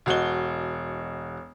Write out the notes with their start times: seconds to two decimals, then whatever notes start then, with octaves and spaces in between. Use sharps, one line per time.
0.06 E1 F#4 D#5 G7